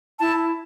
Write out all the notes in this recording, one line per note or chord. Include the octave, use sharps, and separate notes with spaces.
E4 A5